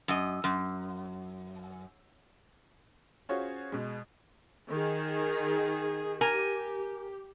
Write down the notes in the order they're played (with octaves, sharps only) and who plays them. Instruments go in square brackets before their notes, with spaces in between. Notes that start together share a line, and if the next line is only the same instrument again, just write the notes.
[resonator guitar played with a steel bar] F#2 D#5
F#2
[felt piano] C#4 F4 F#4 G#4 C5 C#5
B2 G#3
[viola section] D#3 G#4
[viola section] G4 [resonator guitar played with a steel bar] A#4 G#5